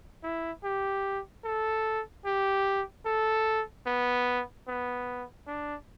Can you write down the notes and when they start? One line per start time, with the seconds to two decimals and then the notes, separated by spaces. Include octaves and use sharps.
0.23 E4
0.64 G4
1.45 A4
2.25 G4
3.06 A4
3.86 B3
4.68 B3
5.47 D4